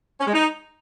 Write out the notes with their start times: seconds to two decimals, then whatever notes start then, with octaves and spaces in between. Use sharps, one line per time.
0.21 C#4
0.27 G#3
0.33 D#4